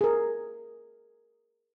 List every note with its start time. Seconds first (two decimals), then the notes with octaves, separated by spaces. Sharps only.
0.01 G#4 A#4